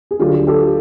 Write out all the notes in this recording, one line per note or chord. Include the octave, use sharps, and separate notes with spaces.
G#4
D2 D3 F#3 F4 G4
G4 A4